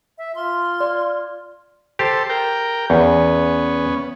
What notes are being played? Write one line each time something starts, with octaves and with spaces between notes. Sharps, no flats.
E5
F4 C6
D5
G4 A4 C5
A#4 G5
E2 B3 C#4